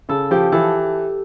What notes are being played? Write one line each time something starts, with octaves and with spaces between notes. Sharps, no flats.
C#3 A4
F3 G4
E3 A4